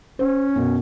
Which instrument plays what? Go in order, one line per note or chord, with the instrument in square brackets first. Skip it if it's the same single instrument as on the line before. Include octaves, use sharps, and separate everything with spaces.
[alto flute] C#4 [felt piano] C5
[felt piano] F#2 B2